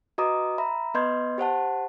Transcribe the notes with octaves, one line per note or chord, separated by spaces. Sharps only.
F#4 B4 D#5 A#5 D6 D#6
E5 A#5 B5
B3 B4 D#5 C6 G6 G#6
G4 C5 F#5 A5